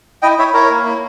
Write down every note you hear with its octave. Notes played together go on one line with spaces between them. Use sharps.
E4 D#5 G5
E4 C#5 E5
E4 A#4 C#5
A#3
E4